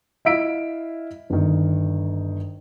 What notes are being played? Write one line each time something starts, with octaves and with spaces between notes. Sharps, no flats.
E4 D#5 F5 E6 B6 D7
G1 D#3